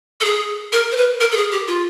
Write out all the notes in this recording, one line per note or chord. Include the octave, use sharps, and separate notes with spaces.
A4
G#4
A#4
C5
B4
A#4
A4
G#4
G4
F4